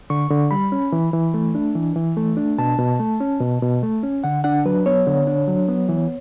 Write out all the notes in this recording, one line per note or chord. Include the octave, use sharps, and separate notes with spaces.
D3 C#6
D3
G3 B5
C#4
E3
E3
A3
D4
E3
E3
A3
D4
B2 A5
B2
A3
C#4
B2
B2
A3
C#4
D3 F#5
D4 F#5
F#3 B4
B3 C#5
D3
D4
F#3
B3
E3